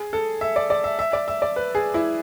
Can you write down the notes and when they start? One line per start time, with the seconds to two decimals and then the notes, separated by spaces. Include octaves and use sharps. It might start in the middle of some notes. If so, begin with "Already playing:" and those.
Already playing: G#4
0.13 A4
0.41 E5
0.56 D5
0.70 D5
0.84 E5
0.99 E5
1.13 D5
1.28 E5
1.42 D5
1.56 B4
1.75 G#4
1.94 E4